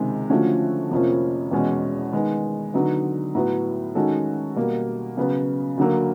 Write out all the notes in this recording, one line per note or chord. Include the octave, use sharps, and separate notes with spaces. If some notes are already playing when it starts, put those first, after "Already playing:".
Already playing: C#2 C3 D#3 G#3
D3 F3 A3 C#4 F#4
F2 C3 F3 A#3 C#4
E2 B2 G#3 C#4
D#3 G#3 B3
D3 F#3 B3 D#4
A2 F#3 B3
D#3 G#3 C#4 F#4 A4
B2 G3 A#3
C#3 F#3 B3
D2 D3 F#3 A#3